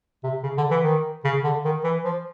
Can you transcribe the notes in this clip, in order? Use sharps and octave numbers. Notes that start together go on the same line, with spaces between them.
C3
C#3
D3
E3
D#3
C#3
D3
D#3
E3
F3